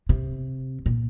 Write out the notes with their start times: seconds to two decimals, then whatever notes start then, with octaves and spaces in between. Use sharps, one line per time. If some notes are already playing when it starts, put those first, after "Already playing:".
0.09 C3
0.86 A#2